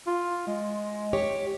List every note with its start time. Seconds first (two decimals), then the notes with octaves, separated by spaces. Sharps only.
0.07 F4
0.47 G#3
1.13 G4 C#5